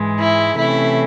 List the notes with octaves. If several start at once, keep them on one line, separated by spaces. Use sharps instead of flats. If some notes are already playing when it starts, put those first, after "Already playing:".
Already playing: G#2 E3 G#3
E4
C3 E3 A3 C#4 E4